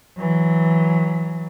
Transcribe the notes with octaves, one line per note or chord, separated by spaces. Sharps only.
E3 F#3